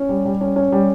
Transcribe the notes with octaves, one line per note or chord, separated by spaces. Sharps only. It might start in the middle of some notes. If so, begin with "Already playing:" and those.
Already playing: C#4
G3
G3
C#4
C#4
G3